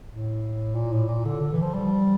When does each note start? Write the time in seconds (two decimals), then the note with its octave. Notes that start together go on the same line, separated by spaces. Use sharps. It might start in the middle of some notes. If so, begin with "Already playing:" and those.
0.10 A2
0.75 A#2
0.92 A2
1.09 A#2
1.25 D3
1.40 D3
1.52 E3
1.62 F3
1.74 G3